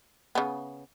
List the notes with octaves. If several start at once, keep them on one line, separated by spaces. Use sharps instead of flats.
C#3 B3